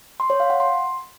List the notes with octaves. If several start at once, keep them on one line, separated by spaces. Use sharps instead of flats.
C6
C#5
F5
F#5
C6